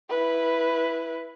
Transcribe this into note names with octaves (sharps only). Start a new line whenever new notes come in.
E4 B4